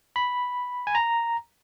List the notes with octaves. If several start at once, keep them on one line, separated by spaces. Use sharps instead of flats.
B5
G#5
A#5